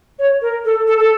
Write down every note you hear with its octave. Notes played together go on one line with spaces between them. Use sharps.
C#5
A#4
A4
A4
A4